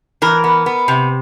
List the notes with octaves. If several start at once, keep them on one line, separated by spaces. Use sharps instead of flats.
E3 A#4
B3
B3
C3